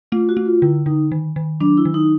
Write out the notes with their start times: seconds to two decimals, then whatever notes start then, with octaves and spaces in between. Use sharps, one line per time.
0.12 A3 F4
0.29 F#4
0.37 A3
0.46 F4
0.62 D3 E4
0.86 D3 D#4
1.12 D#3
1.36 D#3
1.61 F#3 D4
1.77 E4
1.85 D#3
1.94 D#4